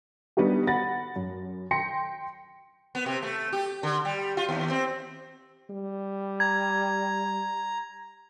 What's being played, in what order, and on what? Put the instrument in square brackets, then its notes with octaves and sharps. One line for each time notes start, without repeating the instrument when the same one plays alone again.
[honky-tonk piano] G3 B3 D4 D#4 F#4 G4
F#5 B5 A6 A#6
F#2
G5 C6 A#6 C#7
[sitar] B3
C3
A3
G4
D3
G3
F4
D#2
C4
[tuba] G3
[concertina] A#5 [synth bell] G#6